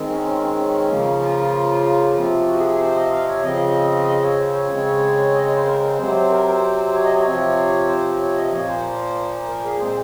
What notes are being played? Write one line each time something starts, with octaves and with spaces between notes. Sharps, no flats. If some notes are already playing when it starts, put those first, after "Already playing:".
Already playing: D#3 G#3 C4
C#4
C#4
C#4
C#3 F3 A#3
F4
C3 F3 C4
F#4
G#4
G#4
C5
D#5
F5
C#5
C#3 F3 C4 D#5
D#5
C#5
C5
C#5
C#3 G#3 C4
D#5
C#5
C5
A#4
C5
C3 F#3 C4 C5
C5
A#4
C5
C#5
D#5
C#5
C3 F3 C4
C5
C#5
D#5
A#2 F3 A#3 C#5
C5
A#4
G#4
A#2 G#3 C4 C5